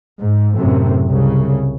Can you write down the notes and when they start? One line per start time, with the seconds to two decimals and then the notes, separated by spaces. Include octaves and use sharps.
0.21 G#2
0.56 F#2 A2 C3
1.06 C2 C#3